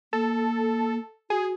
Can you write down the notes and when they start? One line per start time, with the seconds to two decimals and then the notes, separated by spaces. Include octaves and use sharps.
0.13 A#3 A4
1.30 F#4 G#4